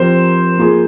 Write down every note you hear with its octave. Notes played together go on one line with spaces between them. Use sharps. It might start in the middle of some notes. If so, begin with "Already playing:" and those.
Already playing: F3 C4 G4 A#4 C5
A#3 F4 G#4